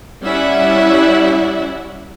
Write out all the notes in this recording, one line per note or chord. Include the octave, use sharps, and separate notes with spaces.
G3 C#4 E4 D5 E5 F#5